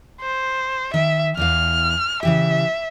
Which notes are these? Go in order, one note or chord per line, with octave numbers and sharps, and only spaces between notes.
C5
D#3 E5 G5
E2 E3 F5 F6
C#3 E3 G4 E5